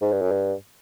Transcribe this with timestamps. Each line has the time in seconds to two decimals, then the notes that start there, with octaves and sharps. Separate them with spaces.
0.02 G#2
0.12 G2
0.22 F#2
0.32 G2